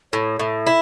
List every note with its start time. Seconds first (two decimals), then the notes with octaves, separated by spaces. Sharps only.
0.12 A2 C#5
0.39 A2 E5
0.67 E4